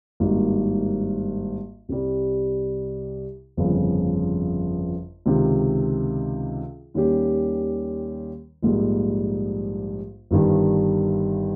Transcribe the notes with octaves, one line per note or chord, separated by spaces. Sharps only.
G#1 G2 G3 A#3 D#4
C2 C3 G3
G1 F2 C#3 F3
C#2 C3 D#3
D#2 D#3 G3 C#4 G4
A#1 G#2 G3 A#3
G1 G2 D#3 G3